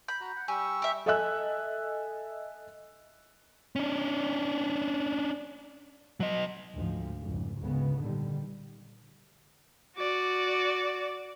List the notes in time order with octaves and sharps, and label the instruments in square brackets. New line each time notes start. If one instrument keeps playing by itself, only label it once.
[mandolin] B5 [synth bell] G6
[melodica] F#4 A#5
F#5
[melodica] G3 C#6 E6 [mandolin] G4 [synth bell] G#5
[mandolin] G4 E5
[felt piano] A4 D#5 E5 G#5 E6 F#6
[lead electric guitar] C#4 D4
F#3 D#5
[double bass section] D2 G#2 F3
F1 C#2 G#2
G#1 D2 C#3 G#3 B3
A#2 D3 D#3 G3
[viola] F#4 D5